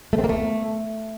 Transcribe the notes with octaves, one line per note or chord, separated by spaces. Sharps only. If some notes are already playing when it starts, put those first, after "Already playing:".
A3
C4
A#3
A3